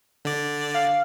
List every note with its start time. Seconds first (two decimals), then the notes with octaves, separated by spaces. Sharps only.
0.25 D3 D5
0.74 F5